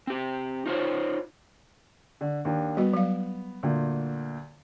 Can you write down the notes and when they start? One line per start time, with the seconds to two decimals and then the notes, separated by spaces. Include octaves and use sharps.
0.07 C4 G4
0.66 D#4 F4 C5 C#5
2.21 D3
2.45 D#2 D4
2.77 G3 B3 F#4
2.93 F#3 F5
3.63 D2 A#2